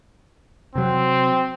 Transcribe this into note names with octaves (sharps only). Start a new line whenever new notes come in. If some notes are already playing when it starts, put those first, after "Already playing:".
C3 F#3 C4